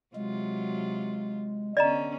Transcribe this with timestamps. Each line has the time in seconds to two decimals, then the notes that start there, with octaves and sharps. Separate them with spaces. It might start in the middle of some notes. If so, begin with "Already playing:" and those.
0.15 C3 F#3 G#3 F4
1.77 D3 B3 C#4 D5 D#5 A#5